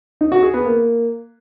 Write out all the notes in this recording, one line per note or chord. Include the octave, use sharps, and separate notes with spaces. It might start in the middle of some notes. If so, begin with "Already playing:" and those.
D#4
F#4
G#4
B3
A#3